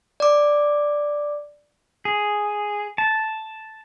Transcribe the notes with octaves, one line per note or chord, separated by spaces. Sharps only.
D5 D6
G#4
A5